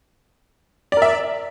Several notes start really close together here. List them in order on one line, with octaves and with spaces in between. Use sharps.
D5 A#4 E5